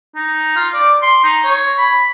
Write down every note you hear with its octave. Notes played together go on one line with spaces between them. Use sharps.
D#4
F4
D5
C6
D#4
C#5
B5